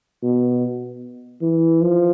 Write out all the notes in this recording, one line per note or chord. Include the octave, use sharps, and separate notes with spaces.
B2
E3
F3